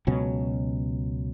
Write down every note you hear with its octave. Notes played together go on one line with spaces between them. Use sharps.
C#2 B2 F#3 C#4